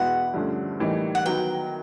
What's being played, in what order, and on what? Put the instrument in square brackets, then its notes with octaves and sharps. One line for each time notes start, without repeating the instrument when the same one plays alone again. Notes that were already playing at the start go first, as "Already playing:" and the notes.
Already playing: [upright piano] E2 B2 G#3 B3 E4 [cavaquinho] F#5
[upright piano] G2 D3 F3 A3 C#4
A2 E3 G3 A#3 D#4
[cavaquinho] F#5
[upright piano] D#3 F#3 B3 [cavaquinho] G5